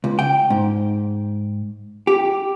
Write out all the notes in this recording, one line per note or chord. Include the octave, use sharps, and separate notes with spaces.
C#2
G5
G#2
G4